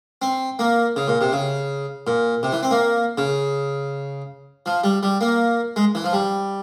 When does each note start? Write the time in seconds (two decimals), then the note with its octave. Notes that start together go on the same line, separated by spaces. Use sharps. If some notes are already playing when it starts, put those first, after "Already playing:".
0.22 C4
0.59 A#3
0.96 C#3
1.08 A#2
1.21 C3
1.33 C#3
2.07 A#2
2.43 C3
2.52 E3
2.63 C4
2.71 A#3
3.18 C#3
4.66 F3
4.84 G3
5.03 G3
5.21 A#3
5.76 G#3
5.95 E3
6.04 F3
6.13 G3